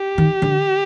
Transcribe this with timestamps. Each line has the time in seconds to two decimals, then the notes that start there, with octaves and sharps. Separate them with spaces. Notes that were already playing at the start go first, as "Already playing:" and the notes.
Already playing: G4
0.18 D#3
0.42 D3